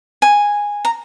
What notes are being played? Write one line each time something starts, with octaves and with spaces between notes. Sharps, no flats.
G#5
A#5